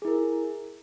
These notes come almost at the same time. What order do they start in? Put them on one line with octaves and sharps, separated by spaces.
G#4 E4 A#4